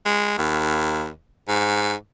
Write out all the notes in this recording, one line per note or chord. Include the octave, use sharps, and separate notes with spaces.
G#3
D#2
G#2